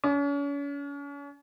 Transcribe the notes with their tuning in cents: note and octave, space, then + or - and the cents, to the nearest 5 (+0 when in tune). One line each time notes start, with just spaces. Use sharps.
C#4 +40